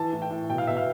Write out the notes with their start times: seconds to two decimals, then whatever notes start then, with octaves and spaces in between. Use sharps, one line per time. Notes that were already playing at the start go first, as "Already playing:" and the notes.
Already playing: E3 A5
0.13 A2
0.22 G5
0.31 A2
0.50 B2 G5
0.58 F5
0.67 B2 E5
0.77 F5